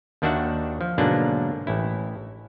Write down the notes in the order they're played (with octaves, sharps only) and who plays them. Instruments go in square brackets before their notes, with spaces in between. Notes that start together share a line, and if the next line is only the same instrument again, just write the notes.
[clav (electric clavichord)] D#2 D#3 D4 F#4 E5 F#5
F3
G#2 B2 D3 F#3 A#3 D4
A1 E4